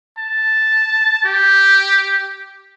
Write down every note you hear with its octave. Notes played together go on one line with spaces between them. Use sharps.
A5
G4